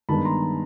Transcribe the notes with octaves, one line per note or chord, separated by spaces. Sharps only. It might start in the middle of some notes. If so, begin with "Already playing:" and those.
G2 D#3 G#3 B3 A5 B5
A#5 C6